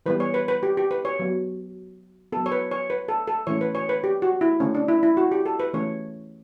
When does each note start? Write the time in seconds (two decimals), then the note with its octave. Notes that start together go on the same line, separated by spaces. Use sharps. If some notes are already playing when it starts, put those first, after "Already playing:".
0.06 E3 G3 B3 B4
0.20 C#5
0.34 B4
0.48 B4
0.63 G4
0.77 G4
0.91 B4
1.05 C#5
1.19 F#3 B3
2.32 F#3 B3 A4
2.46 C#5
2.52 B4
2.71 C#5
2.90 B4
3.08 A4
3.28 A4
3.47 E3 A3 C#4 C#5
3.61 B4
3.75 C#5
3.89 B4
4.04 G4
4.22 F#4
4.41 E4
4.60 D3 A3 C#4
4.75 D4
4.89 E4
5.03 E4
5.17 F#4
5.32 G4
5.46 A4
5.60 B4
5.73 E3 A3 C#4 C#5